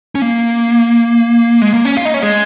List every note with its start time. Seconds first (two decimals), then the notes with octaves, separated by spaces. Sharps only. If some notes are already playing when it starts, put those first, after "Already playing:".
0.15 C#4
0.22 A#3
1.62 G#3
1.74 A#3
1.85 C#4
1.97 F4
2.05 D#4
2.14 C#4
2.22 G#3